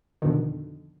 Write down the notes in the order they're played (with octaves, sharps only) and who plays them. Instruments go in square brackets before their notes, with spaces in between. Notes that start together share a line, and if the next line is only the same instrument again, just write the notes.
[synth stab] F2 B2 D3 D#3